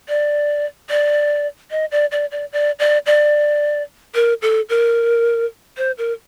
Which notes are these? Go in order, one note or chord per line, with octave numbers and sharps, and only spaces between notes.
D5
D5
D#5
D5
D5
D5
D5
D5
D5
A#4
A4
A#4
C5
A#4